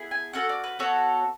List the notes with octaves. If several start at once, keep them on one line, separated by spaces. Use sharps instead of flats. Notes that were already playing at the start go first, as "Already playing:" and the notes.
Already playing: B3 E4 G#4
G#5
C#4 F#4 A4 F#5
D5
B4
B3 F#4 A4 C#5